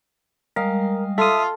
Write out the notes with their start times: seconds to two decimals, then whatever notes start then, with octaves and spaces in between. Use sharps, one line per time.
0.56 G3 G#3 A#4 D#5 F5
1.18 F4 A4 E5 D#6